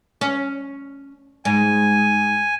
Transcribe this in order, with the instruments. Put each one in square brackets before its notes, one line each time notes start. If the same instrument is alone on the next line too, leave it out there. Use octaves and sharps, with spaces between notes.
[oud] C#4
[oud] G#2 [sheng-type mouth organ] G#5